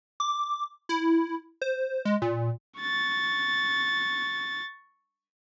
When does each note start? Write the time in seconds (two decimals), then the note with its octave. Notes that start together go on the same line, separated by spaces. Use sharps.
0.20 D6
0.89 E4
1.62 C5
2.05 G#3
2.22 A#2
2.79 C#6 A6